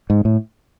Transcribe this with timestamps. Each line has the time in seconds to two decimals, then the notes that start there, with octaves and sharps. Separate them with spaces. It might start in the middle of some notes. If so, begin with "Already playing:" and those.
0.10 G#2
0.25 A2